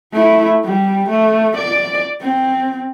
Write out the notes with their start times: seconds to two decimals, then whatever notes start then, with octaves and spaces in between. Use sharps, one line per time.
0.13 A3 E4
0.65 G3
1.09 A3
1.57 D5
2.21 C4